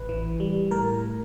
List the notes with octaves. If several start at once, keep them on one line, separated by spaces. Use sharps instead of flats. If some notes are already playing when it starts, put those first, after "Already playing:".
Already playing: A1 B4
E3
G3
A2 A#4